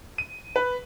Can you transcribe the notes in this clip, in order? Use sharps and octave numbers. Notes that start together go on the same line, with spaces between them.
D#7
B4